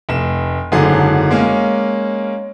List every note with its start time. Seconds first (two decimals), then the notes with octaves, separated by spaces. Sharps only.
0.09 F1 E7
0.72 F#1 G#2 D3 F#3 G#4 A4
1.31 G#3 A#3 C#4